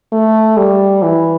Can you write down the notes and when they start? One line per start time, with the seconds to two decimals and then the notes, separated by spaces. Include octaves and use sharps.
0.12 A3
0.57 G3
1.03 E3